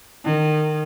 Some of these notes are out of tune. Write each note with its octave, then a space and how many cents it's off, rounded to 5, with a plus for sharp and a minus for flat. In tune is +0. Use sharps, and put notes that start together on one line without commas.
D#3 -25